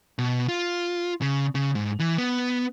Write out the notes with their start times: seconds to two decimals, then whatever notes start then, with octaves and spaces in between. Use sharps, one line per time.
0.18 B2
0.48 F4
1.22 C#3
1.55 C#3
1.75 G#2
1.99 E3
2.18 B3